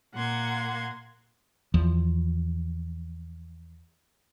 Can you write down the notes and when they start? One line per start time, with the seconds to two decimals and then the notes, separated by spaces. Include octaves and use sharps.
0.14 A#2 A#3 F#5 C6 G#6
1.74 E2 F3